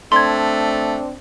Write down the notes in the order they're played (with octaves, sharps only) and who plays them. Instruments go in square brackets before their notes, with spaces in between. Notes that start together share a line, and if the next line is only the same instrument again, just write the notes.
[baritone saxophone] A3 [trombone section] C4 D4 [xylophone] C6 G#6